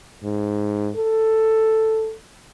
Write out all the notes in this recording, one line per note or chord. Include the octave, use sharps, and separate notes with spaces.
G#2
A4